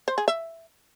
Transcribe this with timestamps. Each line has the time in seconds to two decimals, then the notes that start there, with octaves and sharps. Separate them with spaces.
0.08 C5
0.18 G#4
0.28 E5